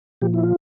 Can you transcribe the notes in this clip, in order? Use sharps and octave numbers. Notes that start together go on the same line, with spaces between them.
A#2 F3 G4
E4
F4